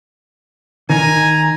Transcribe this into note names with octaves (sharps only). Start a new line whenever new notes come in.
D#3 G#5 A#5